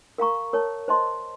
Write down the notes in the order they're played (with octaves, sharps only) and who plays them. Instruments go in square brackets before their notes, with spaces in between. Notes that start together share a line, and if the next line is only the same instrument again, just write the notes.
[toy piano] A#4 F5 A#5 C#6
A#4 C#5 A5
C5 D#5 A5 C6